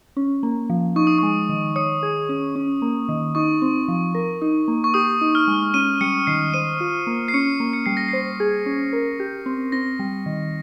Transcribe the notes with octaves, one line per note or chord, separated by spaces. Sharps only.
C#4
A#3
F3
D#4 C#6
D#6
G#3 C#6
D#3
C#5 D#6
G#4
C#4
C#4
A#3
D#3
D#4 C#6
C4
F3
A#4
D#4
A#3
C#6
G4 D#6
D#4
F6
G#3
C#4 D#7
G3 C#7
D#3 C7
C5 D#7
F4
A#3
C7
C#4 C#7
A#3
C#7
G3 C7
A#6
C5 C7
G#4
C#4
A#4
G4
C4
C4 A#6
G3
D#3